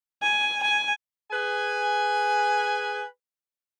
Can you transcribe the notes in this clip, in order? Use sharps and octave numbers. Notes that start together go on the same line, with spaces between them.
G#5
G#5
G#4 B4 G#5